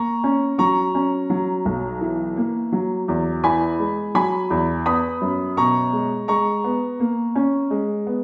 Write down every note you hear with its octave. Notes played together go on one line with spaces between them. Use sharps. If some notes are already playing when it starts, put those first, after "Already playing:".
Already playing: A#3 A#5 C#6
C#4
F#3 A#5 C#6
C#4
F#3
B1
E3
A#3
F#3
E2
E3 G#5 B5
G#3
F#3 G#5 B5
E2
B3 B5 D#6
F#2
B2 A#5 C#6
G#3
G#3 A#5 C#6
B3
A#3
C#4
G#3
B3